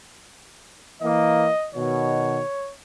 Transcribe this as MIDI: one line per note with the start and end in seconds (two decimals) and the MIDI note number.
1.02 1.47 52
1.02 1.47 58
1.02 1.70 75
1.75 2.40 47
1.75 2.40 51
1.75 2.73 73